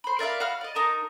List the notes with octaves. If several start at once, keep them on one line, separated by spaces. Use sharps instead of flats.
C5 B5
A#4 D5 E5 F5
F#4 F5 B5 F6
D5 D#5
D#4 A#4 A5